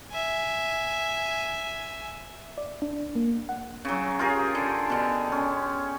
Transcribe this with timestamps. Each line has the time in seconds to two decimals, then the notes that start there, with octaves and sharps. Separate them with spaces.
0.11 E5 G#5
2.58 D5
2.82 D4
3.15 A#3
3.49 F#5
3.85 C#3 F#3
4.19 F4 G4 G#4 A#4
4.55 D3
4.90 B2 D3
5.32 C#4